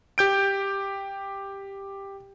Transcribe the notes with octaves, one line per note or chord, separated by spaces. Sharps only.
G4 G6 D7